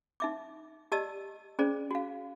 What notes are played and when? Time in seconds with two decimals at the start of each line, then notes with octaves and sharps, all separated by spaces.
0.20 D#4 E5 D6
0.92 G4 D5 D#5 A5 E6
1.59 C#4 G#4 C5 D5
1.91 F#4 F5